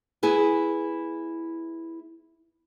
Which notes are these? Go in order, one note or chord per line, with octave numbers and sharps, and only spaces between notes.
B3 E4 G#4 G#5